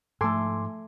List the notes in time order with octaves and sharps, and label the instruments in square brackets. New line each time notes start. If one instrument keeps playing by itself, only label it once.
[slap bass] G#2 F3 [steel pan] A3 A4 [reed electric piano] G#5 C6 D6